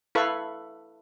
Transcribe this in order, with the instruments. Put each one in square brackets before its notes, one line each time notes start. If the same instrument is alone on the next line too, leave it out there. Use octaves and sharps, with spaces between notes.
[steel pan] E4 A4 B4 F5 B5 C#6